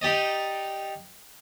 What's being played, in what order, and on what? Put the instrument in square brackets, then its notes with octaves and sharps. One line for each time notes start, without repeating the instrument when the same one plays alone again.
[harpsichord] D#4 G4 D5 D#5